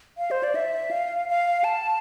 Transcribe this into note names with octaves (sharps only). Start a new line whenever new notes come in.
F5
C5
D5
E5
F5
F5
A5